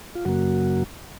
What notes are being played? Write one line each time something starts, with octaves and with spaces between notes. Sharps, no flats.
F4
F#2 C#3 F#3 A#3 F#4